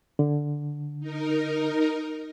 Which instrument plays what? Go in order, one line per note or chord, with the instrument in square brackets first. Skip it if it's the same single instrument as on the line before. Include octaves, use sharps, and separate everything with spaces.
[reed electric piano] D3
[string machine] D#4 A#4